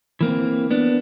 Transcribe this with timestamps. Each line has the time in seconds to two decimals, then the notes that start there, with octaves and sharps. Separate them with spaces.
0.21 E3 A#3 C4
0.71 B3 D4